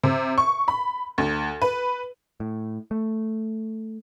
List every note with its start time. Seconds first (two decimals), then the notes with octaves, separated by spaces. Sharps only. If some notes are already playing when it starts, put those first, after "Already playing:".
0.04 C3
0.38 C#6
0.68 B5
1.18 D2
1.62 B4
2.40 A2
2.91 A3